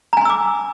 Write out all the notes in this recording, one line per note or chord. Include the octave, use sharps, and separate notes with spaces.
G#5 A#5 C6 D6 E6